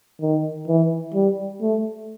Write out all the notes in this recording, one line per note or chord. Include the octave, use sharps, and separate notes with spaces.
D#3
E3
G3
A3